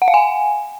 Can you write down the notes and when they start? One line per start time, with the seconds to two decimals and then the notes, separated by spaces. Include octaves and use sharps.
0.02 F#5
0.08 F5
0.14 G#5